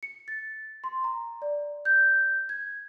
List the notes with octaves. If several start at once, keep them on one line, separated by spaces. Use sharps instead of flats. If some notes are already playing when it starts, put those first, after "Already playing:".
C#7
A6
C6
A#5
D5
G6
G#6